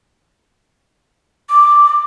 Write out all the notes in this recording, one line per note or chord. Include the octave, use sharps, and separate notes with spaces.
D6